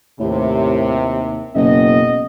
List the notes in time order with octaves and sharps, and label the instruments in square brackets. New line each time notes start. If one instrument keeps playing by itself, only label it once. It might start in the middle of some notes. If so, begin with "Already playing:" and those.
[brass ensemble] D#2 C3 [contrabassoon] A2
[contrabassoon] F#1 [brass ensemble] B2 D#5